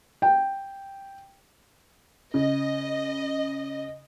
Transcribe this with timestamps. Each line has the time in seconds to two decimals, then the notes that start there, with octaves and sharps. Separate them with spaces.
0.22 G5
2.34 C#3 D#5